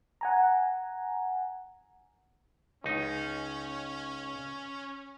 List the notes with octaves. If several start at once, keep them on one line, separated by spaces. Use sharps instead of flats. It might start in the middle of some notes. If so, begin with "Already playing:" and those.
F#5 G#5 A#5
C#2 C#4 D#4